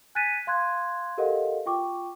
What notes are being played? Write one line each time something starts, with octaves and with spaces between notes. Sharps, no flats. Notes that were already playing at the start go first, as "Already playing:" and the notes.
G#5 F#6 G#6 A6 B6 D#7
F5 C6 F#6 G#6
G4 A4 A#4 D#5 F5 F#5
F4 G5 C#6 D6